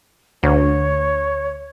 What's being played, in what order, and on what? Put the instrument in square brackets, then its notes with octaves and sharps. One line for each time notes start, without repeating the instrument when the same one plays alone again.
[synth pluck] D2 [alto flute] C#5